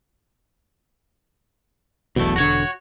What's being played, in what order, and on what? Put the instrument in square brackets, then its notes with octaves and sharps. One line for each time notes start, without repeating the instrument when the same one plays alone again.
[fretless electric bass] E1 B1 B2 [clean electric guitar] E2 A3
[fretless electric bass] E1 D3 [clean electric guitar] F#4 C#5